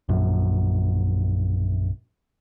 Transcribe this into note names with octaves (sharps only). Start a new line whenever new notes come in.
A#1 F#2